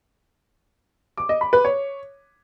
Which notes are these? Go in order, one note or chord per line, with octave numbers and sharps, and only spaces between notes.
D6
D#5
B5
B4
C#5